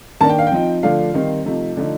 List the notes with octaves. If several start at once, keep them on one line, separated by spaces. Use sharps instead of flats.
D#3 A#3 D4 A5
G5
F5
G5
F3 C4 D#4
D3 F3 A3 D4 F5
D#3 G3 C4 D#4
C3 F3 A3 D#4
D3 F3 A3 D#4